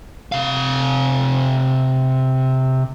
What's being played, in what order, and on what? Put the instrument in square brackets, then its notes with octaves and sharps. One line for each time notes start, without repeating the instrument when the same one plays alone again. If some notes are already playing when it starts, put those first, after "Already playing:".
[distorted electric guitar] C3 F5